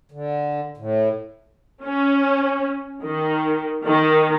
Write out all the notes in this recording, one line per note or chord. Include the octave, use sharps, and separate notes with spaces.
D3
A2
C#4
D#3
D#3